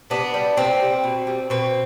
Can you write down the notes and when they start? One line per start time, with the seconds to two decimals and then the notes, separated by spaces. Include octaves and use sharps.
0.10 C3 B3 D4
0.34 G3
0.57 C3 C4
0.80 G3
1.04 B2
1.27 G3
1.50 B2 C4